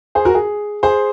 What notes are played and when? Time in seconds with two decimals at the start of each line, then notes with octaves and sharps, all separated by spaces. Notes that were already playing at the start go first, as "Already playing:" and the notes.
0.15 G#4 C5
0.25 F#4 A#4
0.35 G#4
0.83 G#4 C5